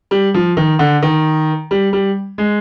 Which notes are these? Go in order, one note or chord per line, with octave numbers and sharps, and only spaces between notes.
G3
F3
D#3
D3
D#3
G3
G3
G#3